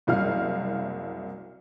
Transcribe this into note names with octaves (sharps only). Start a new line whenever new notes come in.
F#1 C2 F#3 F5 F6